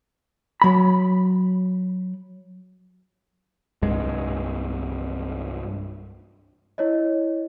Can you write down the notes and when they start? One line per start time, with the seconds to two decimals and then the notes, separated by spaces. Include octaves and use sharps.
0.62 F#3 B5
3.82 C2 G2 G#3
6.78 E4 C#5 D#5